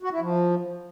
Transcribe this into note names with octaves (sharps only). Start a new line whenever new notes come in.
F#4
E4
F3